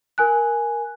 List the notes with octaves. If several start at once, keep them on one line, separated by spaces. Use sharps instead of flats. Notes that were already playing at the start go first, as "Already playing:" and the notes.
A#4 G#5 F#6